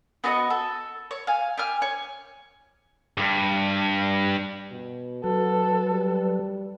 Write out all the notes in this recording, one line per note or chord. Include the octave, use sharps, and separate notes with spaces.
B3 F#4 C5 D#5
A4
C#5
F5 G#5
G4 G#5 F6
C#5
G2
B2
F#3 F#4 A4 B4
G3